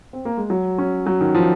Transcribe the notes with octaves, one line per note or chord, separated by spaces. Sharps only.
C4
A#3
G#3
F#3
C#4
F#3
D#3
F3